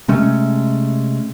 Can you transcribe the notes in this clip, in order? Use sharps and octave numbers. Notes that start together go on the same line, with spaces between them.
C3 G#3 A3 C#4